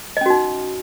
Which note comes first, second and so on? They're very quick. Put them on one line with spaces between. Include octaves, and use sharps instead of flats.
D#5 C#4 F#4 D#4